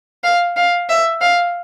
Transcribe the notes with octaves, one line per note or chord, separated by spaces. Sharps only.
F5
F5
E5
F5